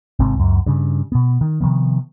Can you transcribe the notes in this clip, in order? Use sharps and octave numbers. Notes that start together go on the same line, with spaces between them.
G#1 G#2 C3 C4
C#2 F#2
G2 C#3
B2 B3
D#3
C3 D#3 F3 B3